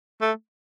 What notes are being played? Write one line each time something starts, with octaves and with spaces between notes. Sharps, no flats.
A3